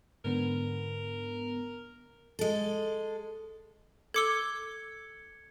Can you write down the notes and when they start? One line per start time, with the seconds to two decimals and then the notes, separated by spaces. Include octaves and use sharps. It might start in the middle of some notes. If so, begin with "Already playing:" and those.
0.25 G#2 D3 B3 A#4
2.39 G#3 A4
4.14 A4 D6 E6 G#6 C#7 G7